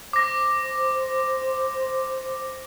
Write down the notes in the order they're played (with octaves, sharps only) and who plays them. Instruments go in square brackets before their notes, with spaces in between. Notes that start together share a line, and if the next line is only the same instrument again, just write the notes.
[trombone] C5 [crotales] D6 A#6